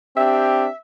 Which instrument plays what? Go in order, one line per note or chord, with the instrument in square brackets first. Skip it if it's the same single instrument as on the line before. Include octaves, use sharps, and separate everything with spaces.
[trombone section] C4 D4 G4 [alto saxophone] E5